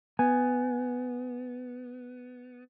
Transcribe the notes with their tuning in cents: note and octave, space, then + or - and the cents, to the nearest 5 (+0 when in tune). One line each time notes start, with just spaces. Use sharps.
B3 +10 G#5 +0